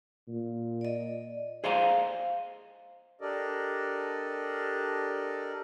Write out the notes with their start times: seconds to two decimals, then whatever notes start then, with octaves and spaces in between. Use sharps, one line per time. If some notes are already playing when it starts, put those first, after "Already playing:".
0.28 A#2
0.81 D5 D#5
1.64 G#4 C5 D#5 F5 A5 A#5
3.21 D4 G4 A4 A#4 D5 D#5